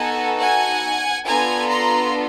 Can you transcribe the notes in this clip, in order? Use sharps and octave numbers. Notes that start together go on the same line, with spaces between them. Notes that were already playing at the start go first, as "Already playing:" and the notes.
Already playing: B3 D#4 F#4 A4 F#5 G#5
F#5 G#5
B3 D4 F4 A4 G#5 A#5
A#5 C6